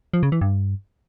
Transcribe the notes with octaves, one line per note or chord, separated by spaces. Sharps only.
F3
C#3
E3
G2